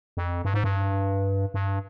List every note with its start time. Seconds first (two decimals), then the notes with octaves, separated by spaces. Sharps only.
0.17 F2
0.45 G2
0.54 G#2
0.64 G2
1.54 G2